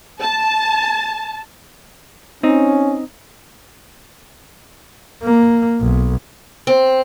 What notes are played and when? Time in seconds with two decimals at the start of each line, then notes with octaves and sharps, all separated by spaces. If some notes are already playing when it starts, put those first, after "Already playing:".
0.21 A5
2.43 C4 C#4 D#4
5.23 A#3
5.81 B1
6.67 C4